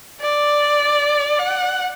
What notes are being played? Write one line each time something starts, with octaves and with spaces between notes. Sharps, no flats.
D5
F#5